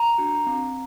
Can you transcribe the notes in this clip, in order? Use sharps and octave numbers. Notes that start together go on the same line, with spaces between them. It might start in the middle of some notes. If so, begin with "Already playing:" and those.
Already playing: A#5
D4 F#4
C4